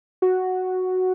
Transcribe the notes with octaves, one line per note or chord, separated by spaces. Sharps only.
F#4